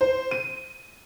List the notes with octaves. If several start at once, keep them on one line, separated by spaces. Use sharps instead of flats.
C5
D#7